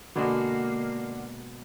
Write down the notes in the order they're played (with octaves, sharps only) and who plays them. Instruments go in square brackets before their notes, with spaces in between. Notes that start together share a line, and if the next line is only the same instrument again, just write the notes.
[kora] B2 G#3 B3 [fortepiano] D3 D4 F#4 [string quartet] A#3